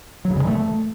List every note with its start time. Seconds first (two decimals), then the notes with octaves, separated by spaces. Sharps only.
0.25 F#3
0.30 C#3
0.36 G2
0.42 D#3
0.47 A3